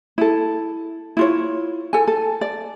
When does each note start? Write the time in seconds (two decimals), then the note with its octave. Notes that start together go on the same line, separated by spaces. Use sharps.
0.18 E4 A4
1.17 E4 F4 C#5
1.93 A4 G#5
2.07 A4
2.41 D5